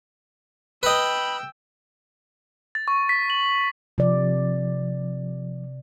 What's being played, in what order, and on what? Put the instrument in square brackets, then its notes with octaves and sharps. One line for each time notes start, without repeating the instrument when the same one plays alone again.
[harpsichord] B4 D#5 [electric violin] G5 E6 [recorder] B5
[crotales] A6
C#6
B6
F#7
[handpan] C3 D5 [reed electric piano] F3